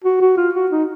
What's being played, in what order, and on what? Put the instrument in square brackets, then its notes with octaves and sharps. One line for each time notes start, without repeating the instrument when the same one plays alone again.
[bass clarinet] F#4
F#4
F4
F#4
D#4